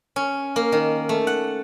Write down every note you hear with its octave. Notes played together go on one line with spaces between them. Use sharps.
C#4
A#3
D#3
A3
F#5